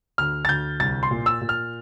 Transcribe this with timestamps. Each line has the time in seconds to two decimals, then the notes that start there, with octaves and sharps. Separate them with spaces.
0.18 D2 F6
0.45 A6
0.49 D2 G6
0.80 C2 A6
1.03 C6
1.11 A#2
1.26 E6
1.41 A#2
1.49 F6